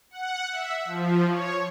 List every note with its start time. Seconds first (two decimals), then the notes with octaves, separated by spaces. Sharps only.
0.11 F#5
0.51 E5
0.85 F3
1.29 C#5